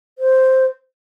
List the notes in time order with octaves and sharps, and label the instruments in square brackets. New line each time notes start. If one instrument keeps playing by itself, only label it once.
[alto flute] C5